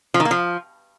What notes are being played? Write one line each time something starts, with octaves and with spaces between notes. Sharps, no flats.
F3
D#3
A#3
F3